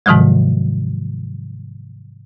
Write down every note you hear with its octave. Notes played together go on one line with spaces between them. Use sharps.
G#2 C3 D#3 F3 F#3 G#3